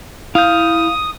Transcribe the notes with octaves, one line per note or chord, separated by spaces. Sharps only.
E4 F5 D#6 G6